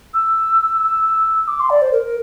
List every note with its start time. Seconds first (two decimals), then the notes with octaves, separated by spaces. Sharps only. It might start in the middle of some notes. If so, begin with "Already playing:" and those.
0.14 E6
1.48 D6
1.60 C6
1.70 D5
1.82 C5
1.92 A#4